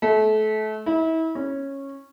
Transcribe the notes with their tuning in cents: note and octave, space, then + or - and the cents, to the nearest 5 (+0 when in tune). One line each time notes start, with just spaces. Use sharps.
A3 -30
E4 -35
C#4 -15